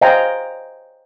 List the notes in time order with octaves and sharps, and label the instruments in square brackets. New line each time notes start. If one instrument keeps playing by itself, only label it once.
[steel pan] C5 D#5 F5 G5 G#5 A#5